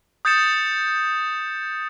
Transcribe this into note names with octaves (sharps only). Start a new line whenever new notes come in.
D#6 G6 A6 C#7 E7